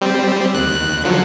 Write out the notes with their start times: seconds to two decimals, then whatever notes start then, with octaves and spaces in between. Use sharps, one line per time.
0.01 G3 C4
0.54 D#2 F#6
1.04 D3 F3 F#3